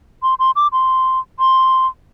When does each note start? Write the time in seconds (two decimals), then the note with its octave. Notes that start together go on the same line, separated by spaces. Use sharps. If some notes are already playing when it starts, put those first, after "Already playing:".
0.23 C6
0.39 C6
0.56 D6
0.73 C6
1.39 C6